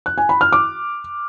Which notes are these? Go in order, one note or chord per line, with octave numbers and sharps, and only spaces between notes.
F#6
G#5
B5
F6
D6